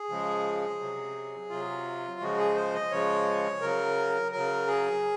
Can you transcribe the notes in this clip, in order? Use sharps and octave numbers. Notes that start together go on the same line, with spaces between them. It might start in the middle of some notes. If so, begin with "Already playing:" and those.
Already playing: G#4
C#3 F3 G#3
C3 F#3
C3 F#3 F4
C#3 F3 G#3 F#4
G#4
C5
D#5
C#3 F3 G#3 C#5
C#3 F#3 A#4
C#3 F#3 A#4
G#4